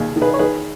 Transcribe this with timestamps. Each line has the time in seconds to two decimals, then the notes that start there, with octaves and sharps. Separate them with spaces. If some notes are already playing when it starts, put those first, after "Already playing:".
Already playing: D#2 D#3 G#4
0.16 D#3
0.21 G#4 B4
0.34 C#5
0.39 D#3 G#4 B4